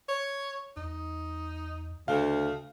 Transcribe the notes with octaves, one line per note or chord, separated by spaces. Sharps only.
C#5
E2 D#4
D2 C#3 A3 F5